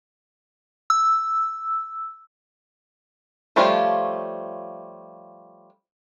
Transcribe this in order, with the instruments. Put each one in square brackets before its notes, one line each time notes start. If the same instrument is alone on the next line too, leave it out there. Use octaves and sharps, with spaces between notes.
[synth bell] E6
[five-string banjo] F3 G3 A3 C#4 F4